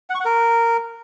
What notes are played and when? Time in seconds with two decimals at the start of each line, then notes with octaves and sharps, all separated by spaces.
0.10 F#5
0.15 C#6
0.20 F#5
0.25 A#4